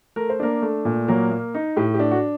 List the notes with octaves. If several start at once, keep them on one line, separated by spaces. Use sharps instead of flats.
A3 A#4
C5
A#3 D4 A#4
A3
A#2
F#3 A#3 A#4
A#3
D#4
A2 G4
G4
D4
F#4